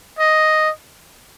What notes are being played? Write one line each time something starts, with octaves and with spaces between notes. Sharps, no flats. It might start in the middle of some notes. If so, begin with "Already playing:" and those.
D#5